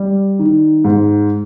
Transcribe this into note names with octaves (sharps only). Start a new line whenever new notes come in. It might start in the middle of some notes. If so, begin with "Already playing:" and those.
Already playing: G3
D#3
G#2